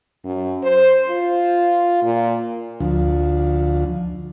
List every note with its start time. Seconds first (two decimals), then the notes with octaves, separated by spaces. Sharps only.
0.25 F#2
0.63 C5
1.09 F4
2.03 A#2
2.80 D2 F3